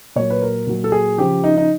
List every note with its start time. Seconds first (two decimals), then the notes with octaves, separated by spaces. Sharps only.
0.16 A#2 F#3 C#5
0.30 B4
0.42 A#4
0.67 A#2 F#3
0.84 A4
0.92 G#4
1.18 C#3 F3 G4
1.44 D#4
1.57 D#4